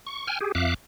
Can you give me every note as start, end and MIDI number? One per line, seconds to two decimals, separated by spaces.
0.07 0.27 85
0.27 0.39 79
0.27 0.39 80
0.27 0.39 89
0.41 0.52 67
0.41 0.52 68
0.55 0.74 41
0.55 0.74 76
0.55 0.74 77
0.55 0.74 86
0.55 0.74 90